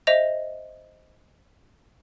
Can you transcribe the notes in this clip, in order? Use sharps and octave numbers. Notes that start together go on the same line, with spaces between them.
C5 D#5 E5 A#6 F7